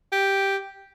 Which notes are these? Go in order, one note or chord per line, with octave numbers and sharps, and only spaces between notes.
G4